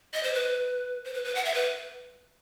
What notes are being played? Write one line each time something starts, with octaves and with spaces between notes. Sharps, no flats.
D#5
C5
B4
C5
B4
B4
F#5
E5
B4